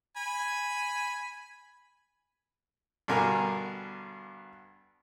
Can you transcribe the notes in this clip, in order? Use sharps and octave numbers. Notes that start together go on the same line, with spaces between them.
G#5 B5
G2 B2 D3 A#4 G#5 A#5